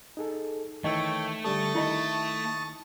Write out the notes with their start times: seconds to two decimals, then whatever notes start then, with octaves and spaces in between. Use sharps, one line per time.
0.17 D#4 G#4 A4
0.84 D#3 E3 A3 C#5 D#5 G5 E6
1.45 D3 G3 A4 A5 C#6 D#6
1.75 D#3 E4 D#5